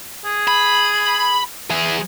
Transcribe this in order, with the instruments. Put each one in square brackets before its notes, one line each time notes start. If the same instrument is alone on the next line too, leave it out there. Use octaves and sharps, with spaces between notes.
[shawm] G#4
[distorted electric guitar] B5
E3 G#4